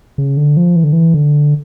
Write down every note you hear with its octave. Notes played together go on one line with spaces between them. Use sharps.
C#3
D3
F3
E3
D3
E3
D3